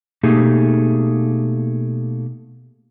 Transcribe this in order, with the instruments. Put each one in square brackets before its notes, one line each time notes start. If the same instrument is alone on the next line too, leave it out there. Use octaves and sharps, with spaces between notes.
[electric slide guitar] B2 A3 A#3 D#4 G4 G#4